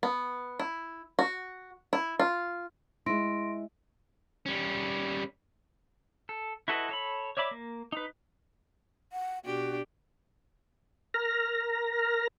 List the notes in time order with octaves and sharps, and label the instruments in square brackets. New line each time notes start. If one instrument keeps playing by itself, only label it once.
[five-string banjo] B3
E4
F#4
E4
F4
[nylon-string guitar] G#3 E4 [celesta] C6 A#6 D7
[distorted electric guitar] G3 C#4
[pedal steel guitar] A4
E4 F#4 A4 B4 D#5
A4 C#5 B5
C#5 D5 E5 B5 D6
A#3
D#4 B4
[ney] F#5
[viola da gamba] B2 D4 G4 [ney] F#4
[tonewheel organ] A#4 A#5 F6 A#6